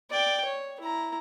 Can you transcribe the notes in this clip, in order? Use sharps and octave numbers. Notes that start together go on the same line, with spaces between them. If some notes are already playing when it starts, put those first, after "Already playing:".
D5 G5
C#5
E4 A#5